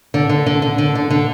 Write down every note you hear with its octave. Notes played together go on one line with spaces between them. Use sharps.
D3
D3
D3
D3
D3
D3
D3